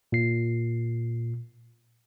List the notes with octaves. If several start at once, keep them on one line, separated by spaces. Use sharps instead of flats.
A#2 C7